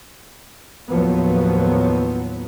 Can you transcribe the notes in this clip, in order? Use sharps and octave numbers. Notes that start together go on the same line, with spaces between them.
D#2 A2 F3 F#3 B3